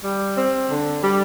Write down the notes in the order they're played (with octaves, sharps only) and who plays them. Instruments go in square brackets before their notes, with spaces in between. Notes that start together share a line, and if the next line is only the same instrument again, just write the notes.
[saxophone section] G3
C4
D3
G3